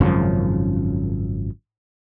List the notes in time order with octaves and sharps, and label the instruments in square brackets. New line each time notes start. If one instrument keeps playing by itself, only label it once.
[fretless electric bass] G#1 F#2 C#3 F3